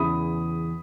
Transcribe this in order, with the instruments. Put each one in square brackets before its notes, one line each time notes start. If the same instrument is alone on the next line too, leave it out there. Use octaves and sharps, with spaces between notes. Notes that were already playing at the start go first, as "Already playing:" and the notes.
Already playing: [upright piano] E2 C#3 E3 B5 D#6